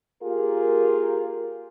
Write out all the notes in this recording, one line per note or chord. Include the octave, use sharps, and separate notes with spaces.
A#3 F4 G4 G#4 A#4